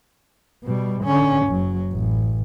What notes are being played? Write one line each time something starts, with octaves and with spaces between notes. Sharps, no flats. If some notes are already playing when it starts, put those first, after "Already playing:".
B2 G3
D3 C#4
F#1 F#3
A1